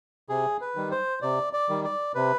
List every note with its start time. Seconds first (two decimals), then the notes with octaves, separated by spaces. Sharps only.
0.29 C3 G#4
0.61 B4
0.76 D#3 G3
0.91 C5
1.22 C3 D5
1.53 D5
1.69 D#3 G3
1.84 D5
2.15 C3 B4